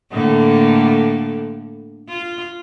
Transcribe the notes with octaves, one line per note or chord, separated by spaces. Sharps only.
A2 D3 A#3
F4